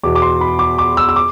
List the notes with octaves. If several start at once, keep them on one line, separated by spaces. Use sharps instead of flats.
E2 B2 D6
D6
C6
B5
D6
D6
E6
E6
D6